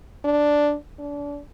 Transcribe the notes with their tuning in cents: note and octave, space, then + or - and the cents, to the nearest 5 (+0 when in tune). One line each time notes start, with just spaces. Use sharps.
D4 +0
D4 -30